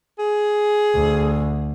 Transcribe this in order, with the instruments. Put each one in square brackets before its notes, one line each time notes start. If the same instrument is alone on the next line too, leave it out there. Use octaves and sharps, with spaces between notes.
[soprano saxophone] G#4
[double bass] D2